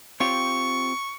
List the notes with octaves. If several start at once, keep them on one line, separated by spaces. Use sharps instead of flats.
C4 F4 G4 C#6